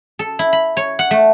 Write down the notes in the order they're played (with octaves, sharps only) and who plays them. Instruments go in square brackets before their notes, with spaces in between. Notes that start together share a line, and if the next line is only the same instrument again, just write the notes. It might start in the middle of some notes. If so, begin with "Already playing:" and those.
[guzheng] A4
E4
B5
C#5
F#5
A3